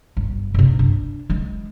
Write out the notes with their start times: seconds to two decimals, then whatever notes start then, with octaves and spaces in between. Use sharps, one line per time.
0.17 G1
0.54 G2 C3
0.79 D4
1.30 E3 G#3